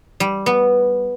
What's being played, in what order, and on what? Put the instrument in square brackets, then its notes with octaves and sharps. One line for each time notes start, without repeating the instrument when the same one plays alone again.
[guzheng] G3
B3